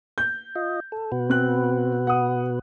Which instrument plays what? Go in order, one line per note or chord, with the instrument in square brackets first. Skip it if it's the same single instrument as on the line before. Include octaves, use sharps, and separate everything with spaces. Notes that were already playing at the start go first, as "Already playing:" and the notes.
[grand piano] G6
[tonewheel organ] F4 D#5
A4
B2 F#4 B4
[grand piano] C4 F#6
F#5 D#6